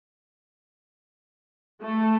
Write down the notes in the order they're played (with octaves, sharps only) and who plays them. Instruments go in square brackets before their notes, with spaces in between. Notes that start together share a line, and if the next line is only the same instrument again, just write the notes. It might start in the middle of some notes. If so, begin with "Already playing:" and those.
[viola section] A3